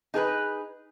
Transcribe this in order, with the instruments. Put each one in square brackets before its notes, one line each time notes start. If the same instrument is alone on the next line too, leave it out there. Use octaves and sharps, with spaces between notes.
[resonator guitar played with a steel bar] D#4 G#4 A#4 B4